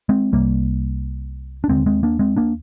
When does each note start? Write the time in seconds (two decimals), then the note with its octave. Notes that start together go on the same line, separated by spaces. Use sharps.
0.09 G#3 C4
0.32 C2 C3 G3 A#3
1.64 D4
1.68 D#2 D3 G#3 C4
1.86 G#3 C4
2.03 A#3 D4
2.19 G#3 C4
2.37 A#3 D4